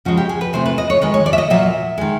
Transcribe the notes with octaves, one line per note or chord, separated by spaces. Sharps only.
C#3 F3 G#3 F#4
G4
G#4
B4
C3 E3 A3 C5
B4
D#5
C#5
D#3 G#3 B4
C#5
D5
E5
D#5
A#2 F#3 A#3 E5
D#3 G#3